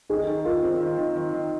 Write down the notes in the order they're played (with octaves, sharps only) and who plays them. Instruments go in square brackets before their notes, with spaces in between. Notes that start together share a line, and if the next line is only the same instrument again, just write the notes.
[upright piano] D#3 [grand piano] D#4 G#4
[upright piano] D#3
[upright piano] D#3 [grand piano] F4 A#4
[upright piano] C4
D#3
D#3
D#3
D#3